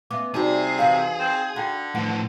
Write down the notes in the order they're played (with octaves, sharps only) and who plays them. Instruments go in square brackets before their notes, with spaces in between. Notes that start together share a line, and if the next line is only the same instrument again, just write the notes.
[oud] B3 C#4 F4 [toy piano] E5 D6
[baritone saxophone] C3 [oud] G3 C4 D4 [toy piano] D#4 F#4 [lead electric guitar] G#4
[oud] F2 E3 [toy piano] F4 D5 F5
[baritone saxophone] C4
[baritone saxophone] D3 [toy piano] F4 G5 [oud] F#4
[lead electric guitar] A2 F3 [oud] E3 [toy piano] F#5